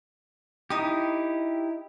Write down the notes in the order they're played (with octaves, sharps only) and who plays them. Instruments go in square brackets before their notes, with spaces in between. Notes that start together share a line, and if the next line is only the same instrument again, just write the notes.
[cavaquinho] D#4 D#5 D#6 [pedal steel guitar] E4 G4